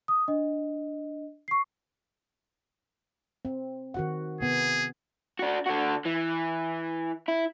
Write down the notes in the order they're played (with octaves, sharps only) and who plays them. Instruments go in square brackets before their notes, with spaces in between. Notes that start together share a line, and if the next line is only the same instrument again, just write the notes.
[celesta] D#6
D4 D#5
C#6 C7
[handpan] C4
D#3 F#4 F#5
[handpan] C3 B3 [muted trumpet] G#4
[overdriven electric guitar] D4 F#4
D3 F#4
E3
E4